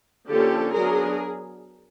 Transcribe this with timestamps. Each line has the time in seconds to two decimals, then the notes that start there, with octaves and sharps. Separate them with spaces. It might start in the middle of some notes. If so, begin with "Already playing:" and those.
0.29 D3 F3 A#3 C#4 G4 A4
0.73 F#3 B3 D4 G#4 A#4